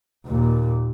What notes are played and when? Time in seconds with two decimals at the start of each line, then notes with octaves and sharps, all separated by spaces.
0.26 D#2 A#2